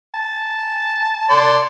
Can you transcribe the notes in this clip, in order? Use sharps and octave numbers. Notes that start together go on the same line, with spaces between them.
A5
D5 C6